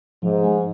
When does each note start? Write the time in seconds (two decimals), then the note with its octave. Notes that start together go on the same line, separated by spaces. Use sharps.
0.23 G#2 F3
0.44 G#3